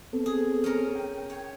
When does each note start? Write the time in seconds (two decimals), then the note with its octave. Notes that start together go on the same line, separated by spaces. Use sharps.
0.13 B3 C4 A4
0.26 G#4
0.64 C#4 A#4
0.95 G5
1.30 C#5